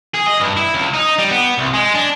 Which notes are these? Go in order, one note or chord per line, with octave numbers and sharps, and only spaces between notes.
G#4
D#5
G2
E4
C#2
D#4
G3
B3
C2
G#3
D4